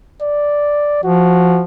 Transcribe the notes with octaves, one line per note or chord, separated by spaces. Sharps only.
D5
F3 F#4